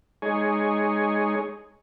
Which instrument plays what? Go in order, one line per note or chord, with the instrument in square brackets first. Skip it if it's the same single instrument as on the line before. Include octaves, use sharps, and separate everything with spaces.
[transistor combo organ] G#3 D#4 G#4 C#5